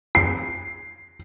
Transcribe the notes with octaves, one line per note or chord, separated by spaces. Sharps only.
C7